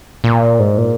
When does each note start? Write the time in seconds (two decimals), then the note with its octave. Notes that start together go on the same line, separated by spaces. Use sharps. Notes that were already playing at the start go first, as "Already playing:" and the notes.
0.24 A#2
0.59 G#2
0.78 A#2